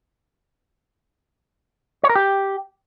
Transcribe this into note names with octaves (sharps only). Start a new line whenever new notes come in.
C#5
A#4
G4